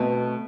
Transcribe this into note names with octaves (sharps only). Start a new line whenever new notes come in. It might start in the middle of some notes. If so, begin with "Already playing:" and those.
Already playing: B2 A3 C4